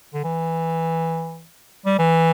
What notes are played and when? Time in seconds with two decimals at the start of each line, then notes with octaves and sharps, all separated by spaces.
0.14 D3
0.24 E3
1.86 G3
1.99 E3